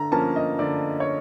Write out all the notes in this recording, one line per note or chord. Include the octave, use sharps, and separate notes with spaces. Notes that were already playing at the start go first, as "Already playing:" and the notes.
Already playing: D3 A#5
F3 A#3 C#4 A5
D#5
D3 D5
C#5